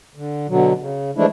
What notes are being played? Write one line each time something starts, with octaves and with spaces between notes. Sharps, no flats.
D3
B2 D3 F#3
C#3
E3 F3 G#3 A3 D4 E4